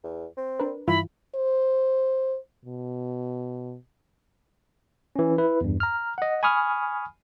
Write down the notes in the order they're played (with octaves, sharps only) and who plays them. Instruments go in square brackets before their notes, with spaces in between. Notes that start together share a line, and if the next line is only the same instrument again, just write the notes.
[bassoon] E2
C4
[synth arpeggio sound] D4 A#4 B4
[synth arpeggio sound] G2 E3 F4 [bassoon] E4 [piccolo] B5
[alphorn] C5
B2
[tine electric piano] E3 C#4
E4 B4
E2 G2
A#5 F6
D#5 F#5
G#5 B5 C#6 D#6 F6